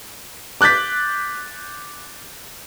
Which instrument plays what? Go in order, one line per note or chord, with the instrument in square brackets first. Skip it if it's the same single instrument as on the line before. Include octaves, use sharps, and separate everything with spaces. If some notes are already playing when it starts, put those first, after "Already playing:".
[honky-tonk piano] D6 F#6 G6 A6 B6